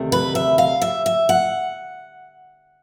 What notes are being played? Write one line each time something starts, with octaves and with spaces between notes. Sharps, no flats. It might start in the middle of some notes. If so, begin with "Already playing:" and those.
Already playing: D2 C3 D#3 A3
B4
E5
F5
E5
E5
F#5